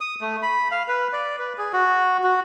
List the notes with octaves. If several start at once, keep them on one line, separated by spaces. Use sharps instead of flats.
D#6
A3
B5
F5
B4
D5
B4
G#4
F#4
F#4